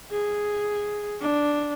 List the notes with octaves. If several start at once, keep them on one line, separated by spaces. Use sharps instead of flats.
G#4
D4